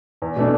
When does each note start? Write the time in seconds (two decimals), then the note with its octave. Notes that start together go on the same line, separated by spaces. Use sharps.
0.22 E2
0.36 B2 A3 D4